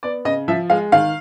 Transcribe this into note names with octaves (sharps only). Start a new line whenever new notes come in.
B3 D5
C#3 D#5
F3 E5
G#3 F5
D#3 F5